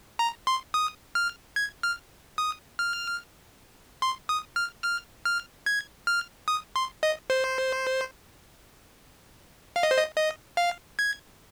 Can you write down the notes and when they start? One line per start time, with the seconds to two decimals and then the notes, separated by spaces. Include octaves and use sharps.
0.19 A#5
0.47 C6
0.74 D#6
1.15 F6
1.56 G#6
1.83 F6
2.38 D#6
2.79 F6
4.02 C6
4.29 D#6
4.56 F6
4.84 F6
5.25 F6
5.66 G#6
6.07 F6
6.48 D#6
6.76 C6
7.03 D#5
7.30 C5
9.76 F5
9.83 D#5
9.91 C5
9.97 D#5
10.16 D#5
10.57 F5
10.99 G#6